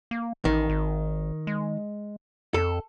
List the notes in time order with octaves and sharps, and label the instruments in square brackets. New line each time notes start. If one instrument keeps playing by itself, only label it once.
[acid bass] A#3
[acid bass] A1 [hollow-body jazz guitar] D#3
[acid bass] G#1
G#3
[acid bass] F2 [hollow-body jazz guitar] A4